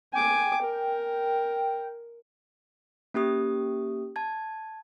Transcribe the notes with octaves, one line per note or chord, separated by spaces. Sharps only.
G5 G#5 D6
A#4
A#3 C#4 G4 D#6
A5 G#6